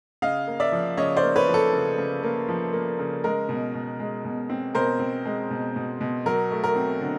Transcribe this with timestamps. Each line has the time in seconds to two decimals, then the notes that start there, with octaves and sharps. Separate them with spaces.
0.22 C#3 D#5 F5
0.47 A#3
0.60 D5 E5
0.72 F3
0.97 C#3 C#5 D#5
1.17 C5 D5
1.23 A#3
1.36 B4 C#5
1.48 F3
1.54 A4
1.73 C#3
1.98 C#3
2.23 A#3
2.49 F3
2.73 A#3
2.99 C#3
3.24 G#3 A#4
3.49 B2
3.75 B2
4.00 G#3
4.25 B2
4.50 C4
4.75 B2 A#4 C5
4.99 C4
5.25 G#3
5.50 B2
5.76 B2
6.01 B2
6.26 F#3 A#4
6.51 A3
6.64 A#4
6.76 C4
7.01 D3